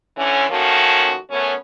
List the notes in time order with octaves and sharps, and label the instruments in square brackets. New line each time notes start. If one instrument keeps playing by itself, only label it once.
[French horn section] D3 E3 C#4
D#3 F3 A3 A#3 C#4 F#4
F#2 A3 B3 C#4